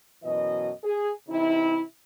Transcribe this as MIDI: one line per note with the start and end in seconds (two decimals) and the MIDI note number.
0.24 0.70 42
0.24 0.70 47
0.24 0.70 52
0.24 0.70 75
0.83 1.11 68
1.29 1.81 48
1.29 1.81 52
1.29 1.81 63
1.29 1.81 64